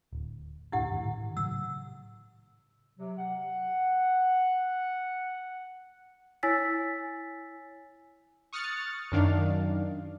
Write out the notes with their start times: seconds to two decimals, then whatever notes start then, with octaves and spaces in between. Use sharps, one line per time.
0.13 D1
0.72 D2 A2 D4 E4 G4 F#5
0.91 G#2 D#3
1.05 A2 D#3
1.37 A2 C#3 F#3 E6
2.98 C3 F#3
3.18 F#5
6.43 E4 C#5 G#5 E6 A6 B6
8.53 C#6 D#6 F6 F#6 A6 C#7
9.12 F#2 D#3 D4 F5